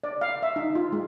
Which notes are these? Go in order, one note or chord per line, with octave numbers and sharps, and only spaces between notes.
D5
F5
E5
D#4
F4
G#3